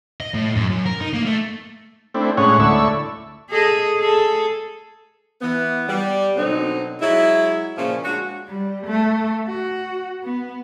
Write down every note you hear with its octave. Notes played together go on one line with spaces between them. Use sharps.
D#5
A2
F#2
F#2
A#4
D#4
A#3
A3
A3 C4 D4 E4
A2 G#3 C#4 C#5 F#5
D2 A3 E4 D5 C#6 E6
G#4 A4 D#5
G#4 A4
E3 B3
G3
B2 D3 F#3 C4 D#4
F#3 G#3 E4
A#2 C#3 F3 C#4
G#3 D4 F#4
G3
A3
F#4
B3